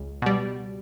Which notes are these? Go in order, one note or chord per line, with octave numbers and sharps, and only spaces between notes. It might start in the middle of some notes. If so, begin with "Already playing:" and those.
Already playing: C#2
B2 G3